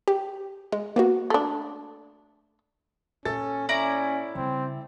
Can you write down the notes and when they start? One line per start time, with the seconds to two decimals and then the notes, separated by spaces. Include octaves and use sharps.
0.08 G4
0.72 G#3
0.96 A#3 B3 F#4
1.30 A3 D4
3.25 A#2 C#4 A4 A6
3.69 C#4 E4 D5 A#5
4.35 C#3 G3 C4